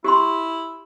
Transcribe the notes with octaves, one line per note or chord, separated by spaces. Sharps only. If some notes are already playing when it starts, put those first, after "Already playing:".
E4 G4 C6